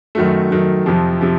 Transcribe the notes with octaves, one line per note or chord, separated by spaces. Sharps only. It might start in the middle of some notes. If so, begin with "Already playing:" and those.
F#2 D#3 F#3 A3
F#2 D#3 F#3 A3
F2 C3 F3
C3 F3